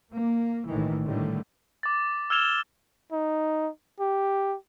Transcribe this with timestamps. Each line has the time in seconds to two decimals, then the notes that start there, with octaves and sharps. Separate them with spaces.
0.14 A#3
0.69 A#1 A2 D#3 E3
1.05 A2 D3 D#3 G3 A3
1.83 D6 A6
2.30 E6 F6 G#6 E7 F7 G7
3.12 D#4
4.00 G4